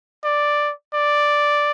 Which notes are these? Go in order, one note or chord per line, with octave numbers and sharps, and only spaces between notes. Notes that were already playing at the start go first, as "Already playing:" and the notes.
D5
D5